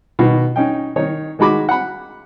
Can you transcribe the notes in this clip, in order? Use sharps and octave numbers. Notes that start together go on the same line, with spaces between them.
B2 D#3 B3
C#4 D#4 G5
D#3 D#4 C#5
D#3 G#3 F#4 B5 D6
F#5 B5